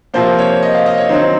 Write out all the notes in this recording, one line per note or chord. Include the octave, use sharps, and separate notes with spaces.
C3 F3 A#3 C5
C#5
D#5
F5
D#5
C#5
D#3 F#3 C4 D#4 C5